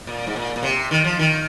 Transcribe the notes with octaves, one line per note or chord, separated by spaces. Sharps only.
A#2
G#2
A#2
A#2
C3
D#3
F3
D#3